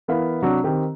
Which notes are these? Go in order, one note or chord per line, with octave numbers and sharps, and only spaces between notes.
E3 B3 A#4 F5 B5
C3 F#3 D4 F#4
D#3 C4 G4